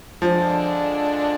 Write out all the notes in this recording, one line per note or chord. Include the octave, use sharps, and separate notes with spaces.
D3 F3 G#3 D4 F4